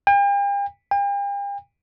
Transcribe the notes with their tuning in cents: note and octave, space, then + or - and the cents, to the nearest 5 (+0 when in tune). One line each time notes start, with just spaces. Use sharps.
G5 +45
G5 +45